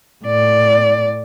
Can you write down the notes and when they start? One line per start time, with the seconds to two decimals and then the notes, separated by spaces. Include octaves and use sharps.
0.25 A2 D5